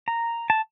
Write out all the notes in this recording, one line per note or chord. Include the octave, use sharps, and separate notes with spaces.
A#5
A5